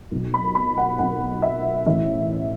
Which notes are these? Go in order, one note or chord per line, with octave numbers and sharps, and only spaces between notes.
B1 B2
B5
B5
F#5
B1 B2 F#5
E5
A1 A2 E3 E5